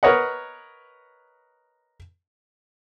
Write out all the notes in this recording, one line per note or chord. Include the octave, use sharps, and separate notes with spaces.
A#4 B4 C#5 D#5 F#5